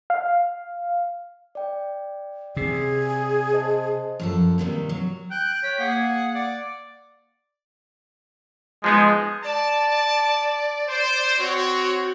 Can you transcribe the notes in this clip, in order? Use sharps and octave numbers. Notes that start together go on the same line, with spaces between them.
F5
D5 G5
C3 G#4
C5 D#5 A5
F#2 F3 A4
G2 C3 D#3 A#3
F#3
G5 F#6
C#5 B6
A#3 G#4 F#5
D5
F3 G#3 B3 D#4
D5 A5
C5
C4 F#4 C#5